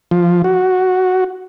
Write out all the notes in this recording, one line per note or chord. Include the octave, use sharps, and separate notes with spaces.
F3
F#4